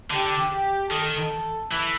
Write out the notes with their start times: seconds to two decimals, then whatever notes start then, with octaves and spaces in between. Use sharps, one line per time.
0.10 D3 G4
0.52 G4
0.91 D#3 A4
1.72 E3